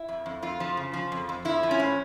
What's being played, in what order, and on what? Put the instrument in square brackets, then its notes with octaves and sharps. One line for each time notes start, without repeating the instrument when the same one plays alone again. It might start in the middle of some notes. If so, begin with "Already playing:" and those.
Already playing: [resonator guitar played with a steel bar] E4
F2
F2
F2 F4
F3
C#3
F3
F2
F2
F3 E4
F3
C#4
A2